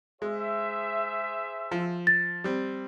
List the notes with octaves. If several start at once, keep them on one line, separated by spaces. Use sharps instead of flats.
G#3 G#4 C5 E5
F3
A6
G3 C4